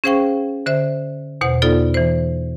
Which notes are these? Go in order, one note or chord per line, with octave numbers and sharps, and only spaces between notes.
C#4 G#4 C5 F5 G5 C#6
D3 C5 E5
E2 B2 C5 F#5
B3 D#4 F4 A4 D5
E3 C5